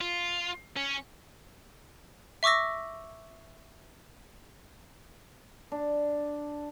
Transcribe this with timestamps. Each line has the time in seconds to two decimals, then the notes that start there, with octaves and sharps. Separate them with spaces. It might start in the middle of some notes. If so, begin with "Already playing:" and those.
0.01 F4
0.77 C#4
2.43 E5 C#6 D6 E6 A#6
5.72 D4